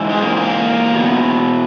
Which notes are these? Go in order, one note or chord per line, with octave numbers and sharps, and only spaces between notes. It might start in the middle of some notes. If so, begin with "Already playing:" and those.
Already playing: G#2 E3
G#3
A#3
A#3
E2 B2